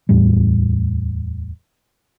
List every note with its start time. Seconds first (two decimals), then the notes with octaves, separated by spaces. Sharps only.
0.09 D1 E2 A2 G3